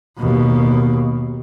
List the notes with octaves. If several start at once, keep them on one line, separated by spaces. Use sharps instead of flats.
D#2 B2